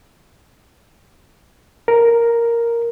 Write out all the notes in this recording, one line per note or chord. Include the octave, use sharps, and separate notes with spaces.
A#4